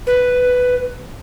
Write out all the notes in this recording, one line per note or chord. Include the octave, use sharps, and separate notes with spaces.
B4